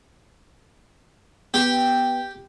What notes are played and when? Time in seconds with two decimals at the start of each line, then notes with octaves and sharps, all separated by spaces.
1.54 B3 G4